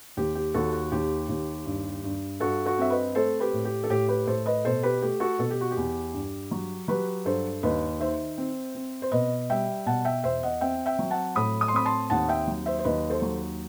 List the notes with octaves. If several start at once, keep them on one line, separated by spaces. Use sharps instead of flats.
D#2 G4
G4
D#2 F#4 A4
F#4
D#2 G4
D#2
G2
G2
G2 F#4 A4
F#4 A4
C4 E5
B4 D#5
A3 A4 C5
G4 B4
A2
G4
A4
A2 G4
G4 B4
A2 A4 C5
B4 D#5
B2 A4 C5
G4 B4
A3 G4
F#4 A4
B2 A4
G4
F#4
G4
E2
G2
F#3
F#3 G4 B4
G2 A4 C5
D#2 B4 D#5
D#3 C5 E5
C4
C4
C5
B2 B4 D#5
G3 E5 G5
B2 F#5 A5
E5 G5
E2 C5 E5
D#5 F#5
C4 E5 G5
E5 G5
F#3
F#5 A5
A2 B5 D#6
D#6
C6
C4 B5 D#6
A5 C6
D#2 F#5 A5
E5 G5
F#3
C5 E5
C5
D#2 B4 D#5
A4 C5
F#3